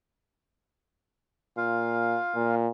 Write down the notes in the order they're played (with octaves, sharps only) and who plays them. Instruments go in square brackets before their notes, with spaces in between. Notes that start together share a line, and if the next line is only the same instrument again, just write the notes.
[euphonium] A#2 [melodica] F4 F5
[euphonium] A#2